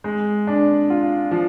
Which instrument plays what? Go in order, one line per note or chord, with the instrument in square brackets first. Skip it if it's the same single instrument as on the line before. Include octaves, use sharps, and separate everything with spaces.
[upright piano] G#3
D4
F4
F3